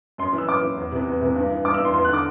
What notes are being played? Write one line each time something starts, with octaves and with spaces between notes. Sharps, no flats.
F#2 C6
E3
E6
F#2 D6
E3
E2
C3 E3
E2
C3 E3
G2
E3
G2 D6
E6
E3 C6
E2 C6
F#6
D3 D6